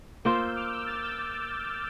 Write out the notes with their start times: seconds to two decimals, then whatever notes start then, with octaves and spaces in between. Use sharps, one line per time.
0.24 A#3 F4 C5 E6 G6
0.55 D6 F6
0.71 E6 G6
0.86 F6 A6
1.02 E6 G6